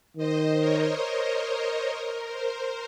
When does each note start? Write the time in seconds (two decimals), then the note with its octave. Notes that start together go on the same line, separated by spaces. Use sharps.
0.17 D#3 C5 D#5
0.59 A#4 C#5
1.29 C5
1.58 A#4
1.86 A#4
2.28 C5